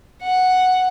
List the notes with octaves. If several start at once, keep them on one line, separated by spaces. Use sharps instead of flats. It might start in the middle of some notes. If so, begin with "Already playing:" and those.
F#5